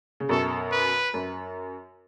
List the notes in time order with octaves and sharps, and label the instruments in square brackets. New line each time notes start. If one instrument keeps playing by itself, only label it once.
[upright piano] C#3
[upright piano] F#2 B2 [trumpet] A4
[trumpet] B4
[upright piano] F#2